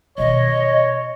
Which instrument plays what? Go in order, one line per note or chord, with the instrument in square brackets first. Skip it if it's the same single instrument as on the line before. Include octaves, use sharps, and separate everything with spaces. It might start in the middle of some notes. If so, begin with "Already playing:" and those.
[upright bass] B2 D#3 [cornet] C#5 [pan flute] D#5